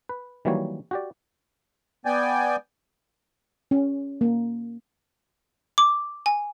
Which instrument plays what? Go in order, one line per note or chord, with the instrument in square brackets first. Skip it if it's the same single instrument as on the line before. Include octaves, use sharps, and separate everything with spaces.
[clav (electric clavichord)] B4
D#3 E3 F#3 G3 A#3 C#5
F#4 G4 D5
[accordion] B3 D5 G5 G#5
[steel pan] C#4
A#3
[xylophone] D6
G#5